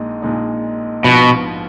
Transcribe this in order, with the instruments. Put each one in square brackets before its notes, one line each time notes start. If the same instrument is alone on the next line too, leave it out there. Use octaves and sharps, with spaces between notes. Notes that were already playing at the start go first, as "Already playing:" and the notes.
Already playing: [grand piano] A#1 A#2 G#3 D#4
A#1 A#2 G#3 D#4
[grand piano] A#1 G#2 F3 B3 F4 [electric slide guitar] B2